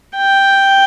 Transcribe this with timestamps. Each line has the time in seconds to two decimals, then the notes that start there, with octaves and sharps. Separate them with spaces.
0.17 G5